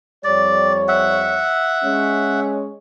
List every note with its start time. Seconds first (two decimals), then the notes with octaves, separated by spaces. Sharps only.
0.24 F2 G3 C#5 D5
0.88 E5 F#5
1.84 G#3 C#4